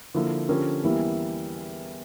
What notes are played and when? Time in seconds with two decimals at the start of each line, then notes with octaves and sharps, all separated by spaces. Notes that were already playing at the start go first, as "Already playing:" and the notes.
0.14 D3 F3 A#3 E4
0.49 D3 F3 C#4 G4 A#4
0.83 E2 E3 G3 A#3 E4